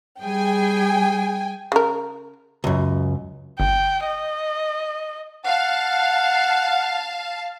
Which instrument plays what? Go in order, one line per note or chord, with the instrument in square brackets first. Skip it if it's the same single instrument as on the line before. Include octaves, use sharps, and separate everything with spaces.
[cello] G3 G#4 [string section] G5 G#5
[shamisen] C#3 A#4
[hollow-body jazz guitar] C#2 F#2
[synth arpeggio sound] G1 [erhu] G5
[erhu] D#5
[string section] F5 A5 [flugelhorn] F#5